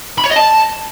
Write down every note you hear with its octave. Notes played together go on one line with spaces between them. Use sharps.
B5
C#5
D#5
A5